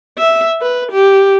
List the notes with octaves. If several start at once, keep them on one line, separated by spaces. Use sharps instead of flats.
E5
B4
G4